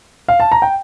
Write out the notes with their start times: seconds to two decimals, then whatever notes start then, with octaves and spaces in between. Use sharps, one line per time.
0.28 F5
0.40 A5
0.52 A#5
0.62 G5